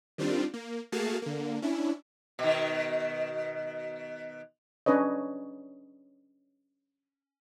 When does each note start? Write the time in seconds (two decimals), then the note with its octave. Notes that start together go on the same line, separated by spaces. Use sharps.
0.18 D#3 G3 C4 D4 F4
0.54 A#3
0.92 A3 A#3 F#4 G#4 F5 A5
1.22 D3 A#3
1.62 C#4 D4 E4
2.39 B2 D#3
4.86 C#4 D4 B4 C#5 D#5